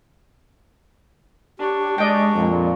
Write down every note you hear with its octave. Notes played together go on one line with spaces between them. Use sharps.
D4 G4 C#5
G#3 D5 D#5 G5
F2 A#2